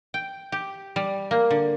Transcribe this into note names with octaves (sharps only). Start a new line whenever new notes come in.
G5
G4
G3
A#3
D3